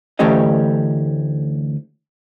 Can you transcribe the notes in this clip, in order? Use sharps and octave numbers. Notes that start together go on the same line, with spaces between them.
D2 E3 A3 C#4 G4 D#5